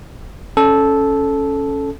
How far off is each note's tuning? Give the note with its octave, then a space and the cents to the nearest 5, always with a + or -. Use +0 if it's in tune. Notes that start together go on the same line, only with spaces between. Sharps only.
C#4 +0 A4 -10